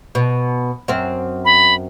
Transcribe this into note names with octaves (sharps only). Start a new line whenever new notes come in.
B2
F#2 C4
B5